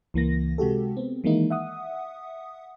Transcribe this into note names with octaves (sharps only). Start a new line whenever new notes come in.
C#2 E3 A#3 A#6
C3 G#3 F#4 G4 A4
B3 C4
D#3 E3 G#3 A#3 D#4 E4
E5 F#5 D#6